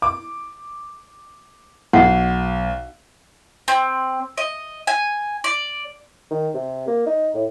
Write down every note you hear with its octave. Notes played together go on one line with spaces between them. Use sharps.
D6
B1 F#5
C4
D#5
G#5
D5
D#3
C3
A#3
D#4
A2